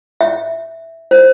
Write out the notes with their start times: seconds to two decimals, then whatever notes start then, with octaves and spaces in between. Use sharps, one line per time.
0.21 E5
1.11 C5